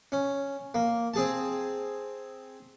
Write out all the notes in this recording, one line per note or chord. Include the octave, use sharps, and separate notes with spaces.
C#4
A#3
C4 G#4 A5